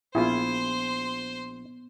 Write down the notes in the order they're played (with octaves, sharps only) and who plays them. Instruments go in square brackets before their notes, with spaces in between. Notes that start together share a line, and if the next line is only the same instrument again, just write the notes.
[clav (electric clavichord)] A#1 G#4 [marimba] B3 [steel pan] E4 F4 [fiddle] C5 C6